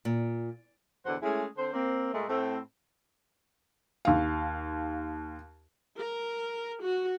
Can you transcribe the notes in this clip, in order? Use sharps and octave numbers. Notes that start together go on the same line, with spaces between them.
A#2
E2 B2 D3 C5 F#5
G#3 A3 C#4 E4 G#4
D3 C4 C5
A#3 C4
A#2 G#3 A3
A2 A3 C4
D#2 F5
A#4
F#4